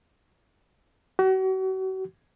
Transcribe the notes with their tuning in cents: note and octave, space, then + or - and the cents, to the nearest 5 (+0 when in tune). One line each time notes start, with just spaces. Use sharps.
F#4 +40